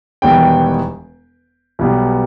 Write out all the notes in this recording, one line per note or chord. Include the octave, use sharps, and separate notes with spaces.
E1 E2 D#3 G3 B3 G5
B1 B2 G3 B3